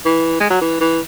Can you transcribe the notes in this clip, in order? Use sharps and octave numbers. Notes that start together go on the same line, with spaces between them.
E3
G#3
F#3
E3
E3